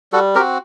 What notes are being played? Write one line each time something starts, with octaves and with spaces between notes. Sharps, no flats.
G3 F#4 A4
C4 F#4 G4 A#4